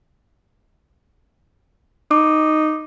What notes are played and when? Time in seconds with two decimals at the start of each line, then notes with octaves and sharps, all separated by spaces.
2.11 D#4 D6